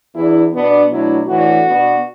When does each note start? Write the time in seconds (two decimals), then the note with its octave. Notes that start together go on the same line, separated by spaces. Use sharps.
0.15 E2 E3 D4 E4
0.53 B2 B3 D4
0.90 B2 F#3 A3 D4 E4
1.27 A2 E3 D4 F#4
1.65 B2 B3 D4